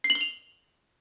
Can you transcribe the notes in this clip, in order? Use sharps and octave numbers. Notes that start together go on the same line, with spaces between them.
C7
F#7
G7
F7